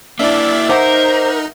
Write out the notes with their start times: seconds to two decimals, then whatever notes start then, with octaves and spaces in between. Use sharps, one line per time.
0.19 A#3 D4 E4 D5 E5
0.69 D#4 A#4 C5 E5 F#5 D6